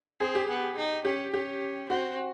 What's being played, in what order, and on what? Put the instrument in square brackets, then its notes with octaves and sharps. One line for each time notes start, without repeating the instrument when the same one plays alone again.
[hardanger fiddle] C4 [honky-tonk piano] G#4
[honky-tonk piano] G4
[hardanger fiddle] B3
D#4
[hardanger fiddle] C#4 [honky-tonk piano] G4
[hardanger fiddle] C#4 [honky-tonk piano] G4
[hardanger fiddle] C4 [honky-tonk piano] F#4